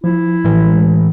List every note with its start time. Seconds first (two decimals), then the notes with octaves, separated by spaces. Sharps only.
0.04 F3 E4
0.45 A2 E3
0.63 G#3